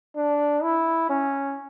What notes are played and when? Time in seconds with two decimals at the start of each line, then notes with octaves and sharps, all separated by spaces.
0.16 D4
0.63 E4
1.10 C#4